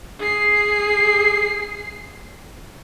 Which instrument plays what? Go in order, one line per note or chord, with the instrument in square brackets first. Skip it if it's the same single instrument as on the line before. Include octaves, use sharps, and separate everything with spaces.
[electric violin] G#4 C7